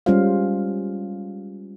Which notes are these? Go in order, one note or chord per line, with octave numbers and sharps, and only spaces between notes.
G3 G#3 C#4 F4 C5 F5